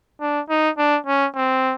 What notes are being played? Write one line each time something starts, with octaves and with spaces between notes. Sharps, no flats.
D4
D#4
D4
C#4
C4